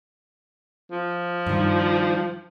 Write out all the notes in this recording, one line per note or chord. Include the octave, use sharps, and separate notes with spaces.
F3
G2 D#3